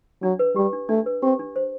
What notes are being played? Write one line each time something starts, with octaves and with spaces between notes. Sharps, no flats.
F#3 D4
B4
G3 G4
D4
A3 D4
B4
C4 G4
D4
C5